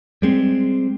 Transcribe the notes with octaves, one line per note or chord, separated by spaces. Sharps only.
G3 G#3 C4